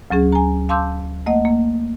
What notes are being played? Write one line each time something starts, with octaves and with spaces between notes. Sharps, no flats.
D2 F#3 C#4 G#4
G#5 A#5
F5 A5 C6 D6 E6 G6
A3 A#3 D#5 F#5
A#3